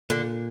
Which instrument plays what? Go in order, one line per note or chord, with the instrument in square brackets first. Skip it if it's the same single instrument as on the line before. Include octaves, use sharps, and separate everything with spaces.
[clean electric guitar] A#2 [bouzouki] D3